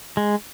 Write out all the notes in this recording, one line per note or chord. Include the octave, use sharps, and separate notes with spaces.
G#3